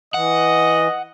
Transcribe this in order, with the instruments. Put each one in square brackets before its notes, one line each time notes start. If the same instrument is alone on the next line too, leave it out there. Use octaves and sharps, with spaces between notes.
[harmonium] E3 [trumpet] D#5 [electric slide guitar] F#5